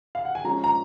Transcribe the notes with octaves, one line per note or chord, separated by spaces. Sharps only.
F5
F#5
G#5
F3 G#3 C#4 A#5
A#5